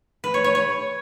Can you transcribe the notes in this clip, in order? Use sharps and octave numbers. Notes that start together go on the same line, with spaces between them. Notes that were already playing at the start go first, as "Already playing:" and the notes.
B4
C#5
C#5
C#5